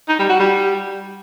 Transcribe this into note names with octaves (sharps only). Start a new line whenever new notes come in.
D#4
G3
F#4
G3